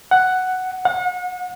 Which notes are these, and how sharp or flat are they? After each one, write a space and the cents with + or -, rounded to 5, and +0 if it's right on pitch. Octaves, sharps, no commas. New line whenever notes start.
F#5 +5
F#5 -35